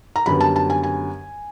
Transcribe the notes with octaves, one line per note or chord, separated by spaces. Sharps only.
A#5
F#2 D3 G3 B3 B5
A5
A5
G#5
G#5